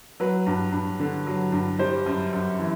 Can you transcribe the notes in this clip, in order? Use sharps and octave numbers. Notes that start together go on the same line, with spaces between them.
F#3 B4
G2
G2
D3
F#3
G2
G3 C5
F#2
F#2
E3